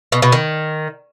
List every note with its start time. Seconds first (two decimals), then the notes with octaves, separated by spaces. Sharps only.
0.12 B2
0.22 B2
0.32 D#3